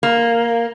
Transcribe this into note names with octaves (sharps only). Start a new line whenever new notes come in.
A#3